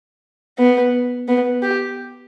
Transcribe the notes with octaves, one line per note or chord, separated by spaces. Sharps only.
B3
B3
G4